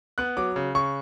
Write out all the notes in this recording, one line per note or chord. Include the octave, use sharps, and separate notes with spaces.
B3 F#6
F#3 D6
C#3
C#3 C#6